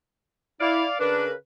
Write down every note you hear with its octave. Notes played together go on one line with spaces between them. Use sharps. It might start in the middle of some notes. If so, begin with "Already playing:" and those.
E4 D5 F5
C#3 D4 A#4 B4